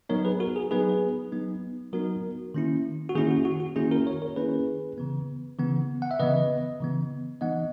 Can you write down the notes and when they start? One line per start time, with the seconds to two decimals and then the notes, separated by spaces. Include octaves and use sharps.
0.09 F#3 B3 D#4 A#4 C#5
0.25 G#4 B4
0.40 F#4 A#4
0.56 G#4
0.71 F#3 B3 D#4 G#4 B4
1.32 F#3 B3 D#4
1.93 F#3 B3 D#4 F#4 A#4
2.54 D#3 A#3 C#4 E4
3.09 F#4
3.15 D#3 A#3 C#4 E4 G#4
3.31 F#4
3.45 F#4
3.60 F#4
3.76 D#3 A#3 C#4 E4 G#4
3.91 F#4 A#4
4.06 A#4 C#5
4.22 A#4 C#5
4.36 D#3 A#3 C#4 E4 G#4 B4
4.98 C#3 E3 B3
5.59 C#3 E3 B3
6.02 F#5
6.11 E5
6.19 C#3 E3 B3 B4 D#5
6.80 C#3 E3 B3
7.41 E3 B3 D#4 D#5 F#5